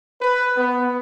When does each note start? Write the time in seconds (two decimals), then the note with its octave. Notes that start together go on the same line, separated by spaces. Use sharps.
0.21 B4
0.57 B3